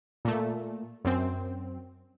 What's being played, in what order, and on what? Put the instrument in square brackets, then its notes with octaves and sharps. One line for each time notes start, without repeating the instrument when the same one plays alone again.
[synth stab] A#2 A3
F#2 C4